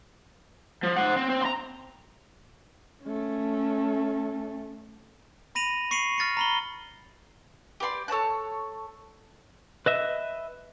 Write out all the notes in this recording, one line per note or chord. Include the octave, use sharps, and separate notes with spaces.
F3
C5 F#5
C4
C4
A#5 C6
A3 C#4
B5 A#6 D#7 F7 F#7
C#6 C7 C#7 D#7 F7 F#7
F6 A6 A#6 C#7
A#5 B5 G7
G4 B4 D5 C6
A4 C#5 A5 F#6
B4 D#5 E5